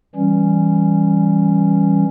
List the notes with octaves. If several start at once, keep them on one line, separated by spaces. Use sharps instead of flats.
E3 G3 C#4